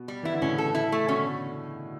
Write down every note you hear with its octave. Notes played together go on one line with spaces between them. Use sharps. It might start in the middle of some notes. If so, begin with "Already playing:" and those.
Already playing: B2
G3
E3 E4
D3
A2 C#3 C#4
A4
E4
A3
B2 D3 C#4